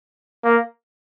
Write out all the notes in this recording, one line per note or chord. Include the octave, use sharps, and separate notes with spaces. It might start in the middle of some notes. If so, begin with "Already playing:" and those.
A#3